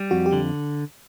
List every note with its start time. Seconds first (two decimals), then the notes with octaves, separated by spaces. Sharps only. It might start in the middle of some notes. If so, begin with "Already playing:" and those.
Already playing: G3
0.11 F2 F#4
0.26 G4
0.32 D3